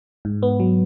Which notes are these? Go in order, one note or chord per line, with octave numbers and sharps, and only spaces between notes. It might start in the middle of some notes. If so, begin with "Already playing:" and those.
G#2
B3
F#3